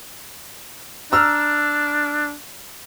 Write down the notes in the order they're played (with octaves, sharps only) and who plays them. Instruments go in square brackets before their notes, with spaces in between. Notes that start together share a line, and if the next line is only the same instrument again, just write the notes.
[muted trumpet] D4 [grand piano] A#5 E6 F6